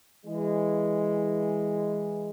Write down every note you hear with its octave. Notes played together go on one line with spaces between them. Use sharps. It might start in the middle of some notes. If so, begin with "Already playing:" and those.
E3 G#3